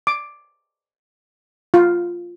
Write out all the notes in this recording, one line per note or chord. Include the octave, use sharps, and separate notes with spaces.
D6
F4